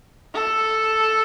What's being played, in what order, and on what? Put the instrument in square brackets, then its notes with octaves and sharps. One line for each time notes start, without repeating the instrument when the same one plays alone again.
[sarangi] A4